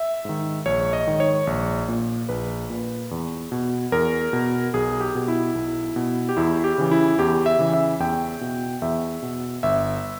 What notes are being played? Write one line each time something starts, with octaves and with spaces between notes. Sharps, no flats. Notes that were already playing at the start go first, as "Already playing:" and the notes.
Already playing: E5
G#2 D#3
A#1 C#5
D#5
G#2 D#3
C#5
A#1
A#2
A#1 B4
A#2
E2
B2
E2 A#4
B2
B1 G#4
G4
B2
E4
B1
B2
G4
E2 E4
G4
C#3 E3
E4
E2 G4
E5
C#3 E3
E5
E2 G5
B2
E2 E5
B2
G1 E5